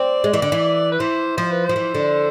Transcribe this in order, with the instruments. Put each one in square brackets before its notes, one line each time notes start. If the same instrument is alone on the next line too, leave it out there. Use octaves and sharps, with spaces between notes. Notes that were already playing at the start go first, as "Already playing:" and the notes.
Already playing: [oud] C4 [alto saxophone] D5
[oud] G#3
E3
D3
E3
[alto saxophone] B4
[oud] E3 [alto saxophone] C5
[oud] F3 [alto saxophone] C5
[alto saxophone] B4
[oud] F3 [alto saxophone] C5
[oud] E3
D3